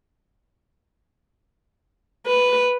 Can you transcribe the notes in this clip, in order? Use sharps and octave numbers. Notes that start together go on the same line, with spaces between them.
B4